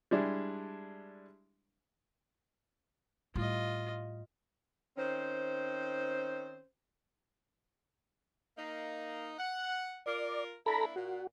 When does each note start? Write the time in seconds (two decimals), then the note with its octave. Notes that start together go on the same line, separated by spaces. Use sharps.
0.11 G3 G#3 D4 E4
3.35 A2 G3 F4 D#5
4.98 D#3 C4 C#4 C5
8.57 A#3 D#4
9.38 F#5
10.06 F4 A#4 D5
10.66 A#3 D4 E4 A4 A#5 B5
10.96 A#2 F#4